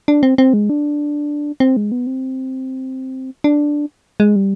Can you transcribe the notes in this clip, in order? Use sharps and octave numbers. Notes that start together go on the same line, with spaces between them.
D4
C4
C4
G#3
D4
C4
G#3
B3
C4
D4
G#3
G3